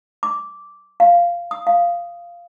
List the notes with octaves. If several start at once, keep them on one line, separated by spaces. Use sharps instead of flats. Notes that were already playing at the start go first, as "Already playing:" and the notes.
D6
F5
D#6
F5